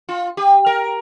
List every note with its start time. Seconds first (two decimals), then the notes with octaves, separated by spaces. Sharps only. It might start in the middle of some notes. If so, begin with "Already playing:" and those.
0.09 F4
0.37 G4
0.66 A#4